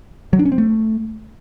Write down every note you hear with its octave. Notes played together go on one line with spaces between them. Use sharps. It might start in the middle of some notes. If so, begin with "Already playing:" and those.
F#3
D4
C#4
C4
A3